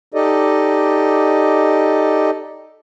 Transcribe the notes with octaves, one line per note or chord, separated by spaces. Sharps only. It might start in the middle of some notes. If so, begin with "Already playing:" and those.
D#4 G4 A4 D5 D#5